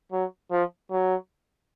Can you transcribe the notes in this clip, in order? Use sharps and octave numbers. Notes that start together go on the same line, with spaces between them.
F#3
F3
F#3